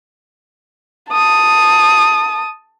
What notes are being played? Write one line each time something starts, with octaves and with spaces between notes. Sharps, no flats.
A5 D#6